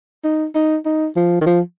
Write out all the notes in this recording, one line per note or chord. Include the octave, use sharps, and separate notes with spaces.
D#4
D#4
D#4
F3
D#3
F3